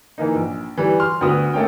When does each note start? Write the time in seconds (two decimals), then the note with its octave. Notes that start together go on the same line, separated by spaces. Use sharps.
0.18 E3 A#3 D#4
0.35 A#1
0.77 E3 G3
1.00 C6 F6
1.21 D2 D3 B3 F#4 D#6
1.53 A3 A#3 C#4 G5